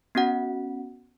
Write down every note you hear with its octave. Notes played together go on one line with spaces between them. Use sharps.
B3 C#4 F#4 F#5